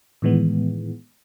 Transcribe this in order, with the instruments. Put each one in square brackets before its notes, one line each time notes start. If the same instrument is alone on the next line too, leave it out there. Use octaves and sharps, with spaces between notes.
[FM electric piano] A2 D#3 E3 G#3 B3